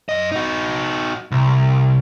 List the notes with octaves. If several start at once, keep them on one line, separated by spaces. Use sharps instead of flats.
F#2 D#5
D#4 F#4
C2